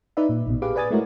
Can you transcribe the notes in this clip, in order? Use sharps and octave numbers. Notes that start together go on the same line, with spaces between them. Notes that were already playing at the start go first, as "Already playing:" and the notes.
D#4 B4 D5 E5
A#2
A1 B2
G4 G#4 B4 F5 D6
B4 D5 G#5 D#6 A6
G#3 A3 E4 F#4 A#4 C#5